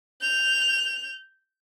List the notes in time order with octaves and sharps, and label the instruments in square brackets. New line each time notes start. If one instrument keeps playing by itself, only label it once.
[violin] G6 F7